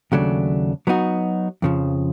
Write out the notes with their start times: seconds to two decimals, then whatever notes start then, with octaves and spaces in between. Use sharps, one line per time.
0.12 D#2 C#3 F#3 A3 D4
0.87 F#3 B3 D#4 F#4
1.62 F2 C#3 F3